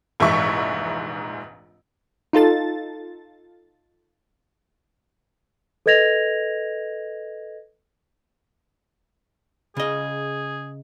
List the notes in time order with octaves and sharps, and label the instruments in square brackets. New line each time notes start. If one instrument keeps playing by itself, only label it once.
[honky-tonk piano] F1 A#1 G#2 E3 E5 C#6
[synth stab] D#4 F4 A4 A6
[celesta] A4 B4 D#5 G#6 A#6 F7
[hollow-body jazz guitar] C#3 D#5 [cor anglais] G#4